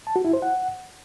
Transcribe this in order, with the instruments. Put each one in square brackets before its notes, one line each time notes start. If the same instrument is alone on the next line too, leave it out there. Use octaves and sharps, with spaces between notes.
[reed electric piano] A5
F#4
E4
C5
F#5